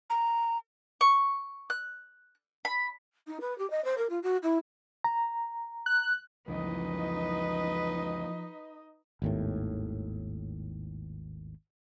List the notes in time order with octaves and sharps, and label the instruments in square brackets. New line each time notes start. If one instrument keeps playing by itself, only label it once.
[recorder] A#5
[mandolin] C#6
F#6
B5
[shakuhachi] D#4
B4
G4
D#5
C5
A#4
F4
F#4
E4
[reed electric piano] A#5
[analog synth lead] F#6
[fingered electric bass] C#2 F#2 E3 [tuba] F3 [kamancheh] D#4 D#5 [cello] B4
[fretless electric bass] G#1 D#2 A2